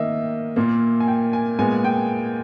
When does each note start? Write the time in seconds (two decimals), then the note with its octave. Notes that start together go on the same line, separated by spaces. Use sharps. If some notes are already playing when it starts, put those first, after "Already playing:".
Already playing: D#3 A#3 D#5 E5
0.56 A#2 A#3
1.00 G#5
1.08 G5
1.33 G#5
1.59 A#2 G#3 B3 G#5
1.84 G5